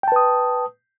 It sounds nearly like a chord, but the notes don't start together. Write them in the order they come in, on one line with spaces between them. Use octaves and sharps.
G5 A5 B4 D#6